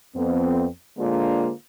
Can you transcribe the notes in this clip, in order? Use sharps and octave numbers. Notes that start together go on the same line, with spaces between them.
F2 B3 C4
D3 G#3 A#3 D4 F4 C5